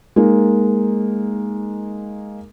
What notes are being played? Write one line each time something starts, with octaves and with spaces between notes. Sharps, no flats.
G#3 A#3 D#4